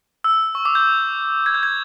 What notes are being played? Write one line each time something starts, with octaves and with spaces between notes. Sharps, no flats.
E6
C#6
D6
G6
G#6
G6
G#6